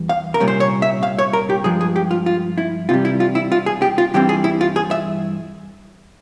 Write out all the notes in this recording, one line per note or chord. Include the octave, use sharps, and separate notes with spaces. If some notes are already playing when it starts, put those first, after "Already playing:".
Already playing: E2 E3 G3
F5
A#4
C2 A#2 G3 C#4
C5
C#5
E5
F5
C#5
A#4
G4
G2 F3 G#3 G#4
G#4
G4
F4
F4
E4
C3 E3 G3 F4
E4
F4
E4
F4
G#4
G4
F4
G2 E3 G3 C4 G4
G#4
E4
F4
G#4
E5